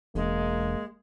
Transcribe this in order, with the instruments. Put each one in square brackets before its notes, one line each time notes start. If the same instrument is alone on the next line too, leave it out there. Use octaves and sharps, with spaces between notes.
[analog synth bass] E1 [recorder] G#3 [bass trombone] A#3